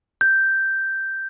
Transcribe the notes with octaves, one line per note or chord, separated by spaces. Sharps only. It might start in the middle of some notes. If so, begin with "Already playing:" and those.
G6